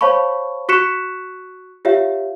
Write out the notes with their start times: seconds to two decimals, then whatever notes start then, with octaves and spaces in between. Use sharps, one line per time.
0.01 C5 C#5 F5 A5 B5 C#6
0.69 F#4 C#6 F#6 B6 C#7 E7
1.85 F4 G4 C#5 E5 F5